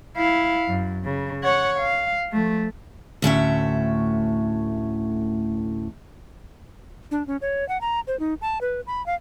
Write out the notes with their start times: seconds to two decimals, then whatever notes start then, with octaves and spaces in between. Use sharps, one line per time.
0.17 E4 F5
0.68 F#2
1.04 C#3
1.44 C#5 F#5
1.80 F5
2.33 F3 A3
3.22 D2 A2 C#4 E5
7.11 D4
7.27 C#4
7.42 C#5
7.69 F#5
7.81 A#5
8.07 C5
8.20 D#4
8.41 A5
8.61 B4
8.87 B5
9.06 F5